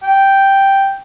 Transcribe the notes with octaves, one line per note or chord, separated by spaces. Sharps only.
G5